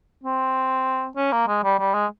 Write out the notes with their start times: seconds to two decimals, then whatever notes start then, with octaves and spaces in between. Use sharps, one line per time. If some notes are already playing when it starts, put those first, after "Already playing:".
0.24 C4
1.16 C#4
1.32 A#3
1.48 G#3
1.64 G3
1.79 G3
1.94 G#3